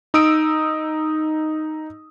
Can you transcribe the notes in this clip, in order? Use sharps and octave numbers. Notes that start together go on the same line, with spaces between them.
D#4 D#6 E6 D7